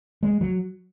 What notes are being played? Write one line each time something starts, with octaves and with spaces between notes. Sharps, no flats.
G#3
F#3